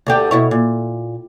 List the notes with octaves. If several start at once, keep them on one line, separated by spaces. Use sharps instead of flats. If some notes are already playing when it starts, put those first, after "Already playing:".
D2 D3 G4
B2 E4 C#5
A#2